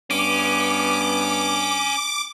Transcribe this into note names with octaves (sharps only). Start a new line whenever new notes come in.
G2 B3 C#4 D6